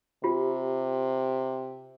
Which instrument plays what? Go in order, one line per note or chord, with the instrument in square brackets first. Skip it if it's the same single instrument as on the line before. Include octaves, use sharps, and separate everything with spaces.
[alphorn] C3 [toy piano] F4 G4